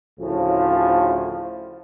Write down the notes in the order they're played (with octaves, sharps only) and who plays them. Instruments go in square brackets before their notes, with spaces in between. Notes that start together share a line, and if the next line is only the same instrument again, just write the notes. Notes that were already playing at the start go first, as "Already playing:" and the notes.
[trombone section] D2 A2 C#3 F3